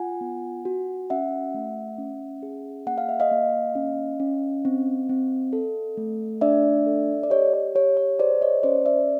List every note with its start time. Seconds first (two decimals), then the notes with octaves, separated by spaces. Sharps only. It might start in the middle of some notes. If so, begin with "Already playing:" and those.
Already playing: F4 F#5 G#5
0.21 B3
0.65 F#4
1.10 C#4 E5 F#5
1.54 A3
1.98 C#4
2.43 G#4
2.87 A#3 F#5
2.98 F5
3.09 E5
3.20 D#5 F5
3.31 A#3
3.75 C#4
4.20 C#4
4.65 C4
5.09 C4
5.53 A4
5.97 A3
6.41 D4 D5 E5
6.86 A4
7.23 D5
7.30 G4 C#5 D#5
7.53 C#5
7.75 G4 C#5
7.97 C#5
8.19 G#4 C5 D5
8.41 C#5 D#5
8.63 C#4 C5 D5
8.85 D5 E5